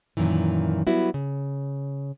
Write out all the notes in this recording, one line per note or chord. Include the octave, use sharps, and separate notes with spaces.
F#2 A#2 D#3 E3
F#3 G3 B3 E4 F#4
C#3